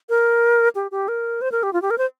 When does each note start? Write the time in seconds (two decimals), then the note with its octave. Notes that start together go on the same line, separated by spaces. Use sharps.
0.09 A#4
0.75 G4
0.91 G4
1.08 A#4
1.41 C5
1.52 A#4
1.63 G4
1.73 F4
1.82 G4
1.91 A#4
1.98 C5